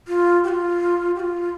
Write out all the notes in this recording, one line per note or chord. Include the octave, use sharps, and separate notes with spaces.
F4
G4
F4
G4
F4